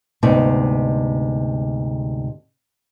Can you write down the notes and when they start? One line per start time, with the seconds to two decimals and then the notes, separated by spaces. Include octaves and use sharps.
0.23 D2 G#2 C3 B3 D#4